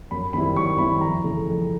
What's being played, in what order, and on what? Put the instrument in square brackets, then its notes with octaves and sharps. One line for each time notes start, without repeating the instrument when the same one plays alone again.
[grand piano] F#2 B5
D#3 G3 C4 E4 B5
F#2 C#6
D#3 G3 C4 E4 B5
F2 A#5
C#3 E3 A3
F2